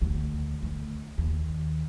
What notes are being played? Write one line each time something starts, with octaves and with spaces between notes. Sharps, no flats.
D2
D2
D#2